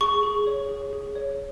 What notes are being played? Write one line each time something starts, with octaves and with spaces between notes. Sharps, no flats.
G#4 C#6
G#4
C#5
G#4
G#4
C#5